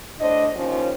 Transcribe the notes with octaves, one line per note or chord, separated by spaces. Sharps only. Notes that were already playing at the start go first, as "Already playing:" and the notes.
A2 D4 C5 D#5
D#2 F3 C#4